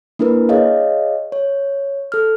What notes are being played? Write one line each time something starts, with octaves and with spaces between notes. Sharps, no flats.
A#3 D4 E4 A#4 B4
G#4 C#5 D#5 F5
C#5
A4 F6